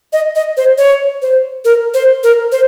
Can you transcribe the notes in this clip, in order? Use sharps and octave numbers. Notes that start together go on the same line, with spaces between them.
D#5
D#5
C5
C#5
C5
A#4
C5
A#4
C5